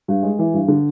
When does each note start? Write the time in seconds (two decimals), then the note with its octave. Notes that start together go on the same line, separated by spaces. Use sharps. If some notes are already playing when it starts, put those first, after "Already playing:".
0.08 G2
0.23 G#3
0.39 E3
0.54 G2
0.68 D3